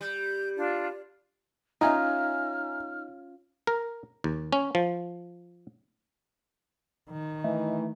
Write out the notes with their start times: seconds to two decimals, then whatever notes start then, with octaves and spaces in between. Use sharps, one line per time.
0.01 G3 G6
0.57 D4 F4 D5
1.81 C#4 D#4 F4 E5 G#5 A#5 F6
3.67 A#4
4.24 D#2
4.52 C#4
4.75 F3
7.10 D#3
7.44 E3 A3 D#4